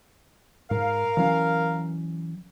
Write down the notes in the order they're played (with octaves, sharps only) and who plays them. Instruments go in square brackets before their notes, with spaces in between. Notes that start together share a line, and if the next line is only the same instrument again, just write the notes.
[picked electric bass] G#2 [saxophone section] A#4 F5
[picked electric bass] E3 F#3 C#4